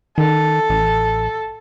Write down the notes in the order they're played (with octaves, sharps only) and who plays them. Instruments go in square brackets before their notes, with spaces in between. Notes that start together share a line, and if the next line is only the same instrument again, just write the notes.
[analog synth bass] D#3 [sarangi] A4
[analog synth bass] A1